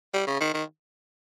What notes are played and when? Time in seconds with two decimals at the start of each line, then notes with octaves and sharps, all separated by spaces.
0.14 G3
0.27 C#3
0.41 D#3
0.54 D#3